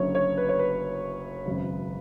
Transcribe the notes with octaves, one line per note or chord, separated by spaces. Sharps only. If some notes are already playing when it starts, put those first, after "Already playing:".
Already playing: F#1 F#2 D3 C#5
C#5
B4
C#5
B4
G#1 F#2 C#3